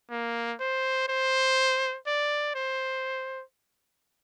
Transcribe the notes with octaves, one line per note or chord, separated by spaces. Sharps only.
A#3
C5
C5
D5
C5